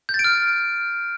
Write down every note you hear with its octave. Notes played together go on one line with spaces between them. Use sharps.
G6
A6
D7
F6